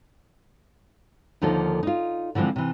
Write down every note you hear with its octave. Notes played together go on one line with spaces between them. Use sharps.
D#2 D3 F3 A#3 D#4 A4
D#4 F4
D3 E3 F3 G#3 C4
C3 E3